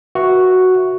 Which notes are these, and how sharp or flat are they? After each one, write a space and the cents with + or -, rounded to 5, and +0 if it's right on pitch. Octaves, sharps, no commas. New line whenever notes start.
F#4 +0 B4 -30 E5 +0